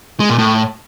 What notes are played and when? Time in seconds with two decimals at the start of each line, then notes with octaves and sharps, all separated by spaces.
0.20 G#3
0.29 A#2
0.38 A2